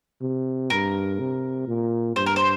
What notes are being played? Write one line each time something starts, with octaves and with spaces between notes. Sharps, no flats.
C3
G2 A#4
C3
A#2
G2 C5
A#4
C5